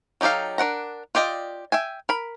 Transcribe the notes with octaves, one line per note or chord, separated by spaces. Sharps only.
F#3 D#4 G4 A4 F5
D4 A#4 F#5 A#5
F4 G4 D5 D#5
E5 G5 G#5
A#4 B5